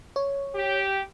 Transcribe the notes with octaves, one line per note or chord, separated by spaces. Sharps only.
C#5
G4